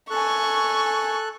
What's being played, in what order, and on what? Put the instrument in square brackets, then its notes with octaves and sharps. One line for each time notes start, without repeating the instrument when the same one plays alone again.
[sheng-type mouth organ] A4 F#6 [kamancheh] G#5 C#6